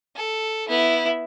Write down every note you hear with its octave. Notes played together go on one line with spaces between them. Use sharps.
A4
B3 E4